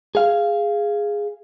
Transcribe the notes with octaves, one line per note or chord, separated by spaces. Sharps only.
G#4 F5